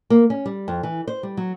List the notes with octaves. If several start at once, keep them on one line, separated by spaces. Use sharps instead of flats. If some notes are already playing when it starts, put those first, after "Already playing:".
A#3
C#4
G3
F2
E3
C5
G3
F#3